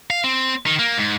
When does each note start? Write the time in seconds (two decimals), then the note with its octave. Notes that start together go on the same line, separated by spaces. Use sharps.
0.10 F5
0.24 C4
0.66 D#3
0.79 A#3
0.98 G#2